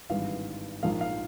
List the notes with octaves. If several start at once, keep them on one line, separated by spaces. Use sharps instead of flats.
G#1 G2 E3 F5
A#1 G#2 F3 A#3 F5
F5